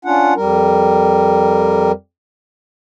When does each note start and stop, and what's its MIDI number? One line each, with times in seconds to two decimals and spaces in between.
0.05 0.34 61
0.05 0.34 62
0.05 0.34 65
0.05 0.34 78
0.36 1.92 41
0.36 1.92 55
0.36 1.92 70